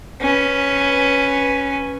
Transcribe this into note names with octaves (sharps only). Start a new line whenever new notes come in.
C#4 B4